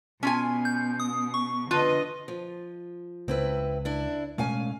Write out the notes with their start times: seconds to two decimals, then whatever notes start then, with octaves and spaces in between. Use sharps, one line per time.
0.23 B2 C#4 F4 G#5
0.65 G6
1.00 D#6
1.34 C#6
1.71 D3 F4 B4 D#5
2.28 F3
3.28 C#2 C4 E4 B4
3.85 D4 E4
4.38 B2 G#3 A3 C#4 F5 G#5